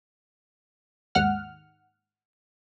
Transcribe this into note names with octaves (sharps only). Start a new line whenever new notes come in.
D#2 G#2 F#5 F6